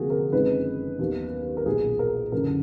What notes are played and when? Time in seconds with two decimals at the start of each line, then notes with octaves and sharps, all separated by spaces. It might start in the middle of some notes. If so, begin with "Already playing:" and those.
Already playing: F1 F2 D3 F#3 A#3 F#4 G#4 A#4
0.10 A#4
0.32 F#1 F2 D#3 G#3 D#4 B4
0.99 D#2 D#3 F#3 B3 D#4
1.57 A#4
1.66 B1 A#2 F#3 G#4
1.99 A#4
2.32 F#1 F#2 D3 A#4